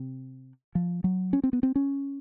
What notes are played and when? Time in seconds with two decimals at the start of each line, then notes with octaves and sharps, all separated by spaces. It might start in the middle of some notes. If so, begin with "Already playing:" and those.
Already playing: C3
0.75 F3
1.04 F#3
1.33 C#4
1.43 C4
1.53 B3
1.63 C4
1.76 C#4